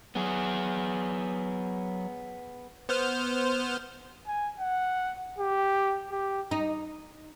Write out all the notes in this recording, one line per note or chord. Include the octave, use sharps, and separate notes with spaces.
F#3 B3 G#4
B3 C5 F6
G#5
F#5
G4
G4
D#4